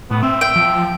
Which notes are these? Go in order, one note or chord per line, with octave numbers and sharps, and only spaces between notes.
A2 B3
C4 E5
G5
F3